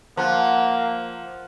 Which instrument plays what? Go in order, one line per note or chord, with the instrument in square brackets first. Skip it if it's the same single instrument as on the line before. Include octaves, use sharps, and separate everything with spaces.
[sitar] F3 [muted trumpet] A#3 [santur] A#4 F#5